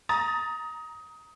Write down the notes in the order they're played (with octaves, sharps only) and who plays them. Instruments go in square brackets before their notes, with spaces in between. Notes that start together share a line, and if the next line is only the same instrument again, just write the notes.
[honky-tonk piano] A#5 D#6 A6